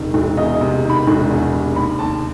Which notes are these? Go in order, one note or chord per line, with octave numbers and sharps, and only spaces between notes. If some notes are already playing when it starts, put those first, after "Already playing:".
Already playing: E1 E2 C3 D#3
E1
E2 D#5
D#5
C3
D#3
B5
E1
E2
C3
D#2 B5
D#2 A5